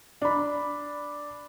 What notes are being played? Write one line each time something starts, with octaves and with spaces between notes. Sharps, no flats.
D4 B5